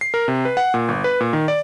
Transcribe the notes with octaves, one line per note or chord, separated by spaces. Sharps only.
C7
A#4
C3
B4
F#5
A#2
G1
B4
A#2
D#3
D5